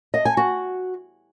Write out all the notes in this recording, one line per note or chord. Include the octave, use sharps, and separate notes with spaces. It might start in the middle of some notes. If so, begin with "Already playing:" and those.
D#5
G#5
F#4